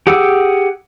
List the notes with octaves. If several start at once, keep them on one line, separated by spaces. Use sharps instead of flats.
G4 G#4 F#5 D6 E6